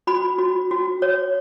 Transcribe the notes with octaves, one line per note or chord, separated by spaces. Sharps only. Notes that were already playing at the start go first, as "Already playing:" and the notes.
F#4 B5
F#4
F#4
C#5